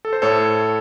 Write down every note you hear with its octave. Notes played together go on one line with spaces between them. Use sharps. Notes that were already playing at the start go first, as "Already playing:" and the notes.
A4
C5
A2 A4 C#5